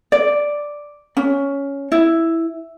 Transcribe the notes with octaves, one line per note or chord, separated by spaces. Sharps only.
D5
C#4
E4